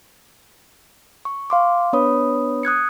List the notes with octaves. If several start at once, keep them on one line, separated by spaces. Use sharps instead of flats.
C#6
F5 C6 D6
B3 D4 B4 C#5 B5 D#6
D#6 F#6 G#6 C#7